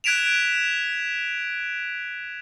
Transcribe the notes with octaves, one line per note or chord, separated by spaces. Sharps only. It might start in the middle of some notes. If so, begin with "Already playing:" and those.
F#6 G#6 B6 D7 E7 F7